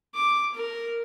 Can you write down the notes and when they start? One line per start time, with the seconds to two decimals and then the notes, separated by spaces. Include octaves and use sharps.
0.14 D6
0.54 A#4